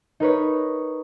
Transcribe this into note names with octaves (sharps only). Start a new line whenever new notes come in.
D#4 A#4 B4 C#5